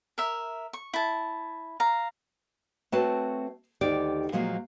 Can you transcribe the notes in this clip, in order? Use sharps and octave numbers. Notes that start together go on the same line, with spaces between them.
A#4 E5
C#6
E4 A5
F5 A#5
A3 C4 F#4 B4 C#5 A5
D2 D#3 G4 D5
A#2 F3 F#3 G#3 A#3